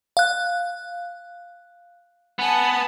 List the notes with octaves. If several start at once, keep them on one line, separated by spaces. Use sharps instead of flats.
F5 F#6
B3 G#5 A5